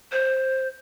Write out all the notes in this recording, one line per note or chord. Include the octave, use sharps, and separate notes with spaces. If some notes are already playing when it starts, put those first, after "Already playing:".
C5